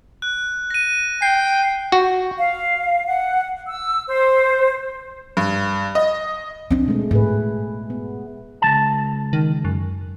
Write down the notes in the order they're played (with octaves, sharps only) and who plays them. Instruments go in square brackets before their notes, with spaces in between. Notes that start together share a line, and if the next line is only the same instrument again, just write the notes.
[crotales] F#6
A#6 D#7
[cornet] G5 [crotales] C7
[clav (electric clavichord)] F#4
[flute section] F5
F#5
E6
C5
[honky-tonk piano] G2
D#5
[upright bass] C4 D4
[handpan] B2 G#3 A3
[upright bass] A2 [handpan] A3 G#4 B4
[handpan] B3
[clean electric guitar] C#2 E3 A5
[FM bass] D#3
F#2